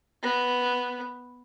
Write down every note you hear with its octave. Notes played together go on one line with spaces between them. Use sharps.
B3